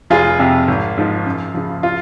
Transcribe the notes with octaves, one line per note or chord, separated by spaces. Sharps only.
F1 F4 G#4
F2 C3
G#1
G#2 F3
F#2
C#3 F3
F4